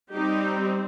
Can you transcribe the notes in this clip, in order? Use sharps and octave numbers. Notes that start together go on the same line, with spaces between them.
G3 C4 D#4 G4